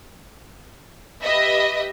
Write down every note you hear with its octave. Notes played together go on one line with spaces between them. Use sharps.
G4 B4 D#5 E5